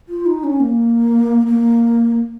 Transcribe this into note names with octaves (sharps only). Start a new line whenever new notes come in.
F4
D#4
C#4
A#3
A#3